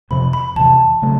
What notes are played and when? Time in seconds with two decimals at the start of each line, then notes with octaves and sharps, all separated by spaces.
0.11 F2 C3 F3 B5
0.33 B5
0.56 E2 C3 E3 A5
1.02 C#3 F#3 A3